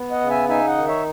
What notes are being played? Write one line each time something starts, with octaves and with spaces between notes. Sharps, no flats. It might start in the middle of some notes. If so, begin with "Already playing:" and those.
Already playing: B3
D#5 F#5
C#3
E5 G#5
D#4 E5 G#5
D#5 F#5
D#3
C#5 E5